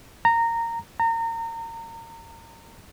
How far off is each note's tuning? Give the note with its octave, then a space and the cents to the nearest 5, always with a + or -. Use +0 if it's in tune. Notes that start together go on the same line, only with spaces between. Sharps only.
A#5 -15
A#5 -30